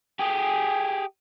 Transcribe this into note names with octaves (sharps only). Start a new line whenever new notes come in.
G4 G#4